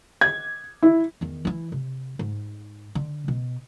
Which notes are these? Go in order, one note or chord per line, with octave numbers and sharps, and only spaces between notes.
G#6
E4
E2 D#3
E3 E4
C3
G#2
D3
B2